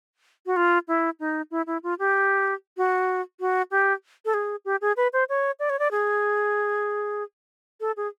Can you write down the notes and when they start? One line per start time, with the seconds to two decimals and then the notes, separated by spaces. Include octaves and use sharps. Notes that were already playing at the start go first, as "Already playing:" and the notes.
0.46 F#4
0.56 F4
0.88 E4
1.20 D#4
1.51 E4
1.67 E4
1.83 F4
1.99 G4
2.77 F#4
3.40 F#4
3.71 G4
4.25 A4
4.34 G#4
4.65 G4
4.81 G#4
4.97 B4
5.13 C5
5.29 C#5
5.60 D5
5.70 C#5
5.79 D5
5.91 G#4
7.81 A4
7.97 G#4